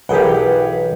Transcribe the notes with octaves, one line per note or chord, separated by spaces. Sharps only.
B1 E3 G4 G#4 A#4 B4 F#5 G5